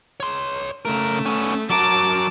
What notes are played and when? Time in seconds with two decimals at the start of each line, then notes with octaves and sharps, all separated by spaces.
0.20 C#5 C6
0.85 C#3 A3 A#4
1.26 B3 C#4
1.70 F#3 A#4 A5 D6